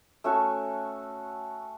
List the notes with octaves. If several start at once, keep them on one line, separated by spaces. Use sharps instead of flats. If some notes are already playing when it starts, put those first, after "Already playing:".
A3 C#4 F#4 A4